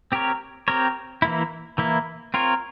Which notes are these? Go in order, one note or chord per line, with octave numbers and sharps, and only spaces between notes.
C4 G4 A#4 C#5
C4 G4 A#4 C#5
E3 A#3 E4
E3 A#3 E4
C4 F4 A#4 C#5